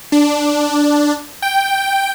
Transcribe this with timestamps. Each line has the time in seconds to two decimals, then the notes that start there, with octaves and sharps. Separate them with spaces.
0.12 D4
1.42 G5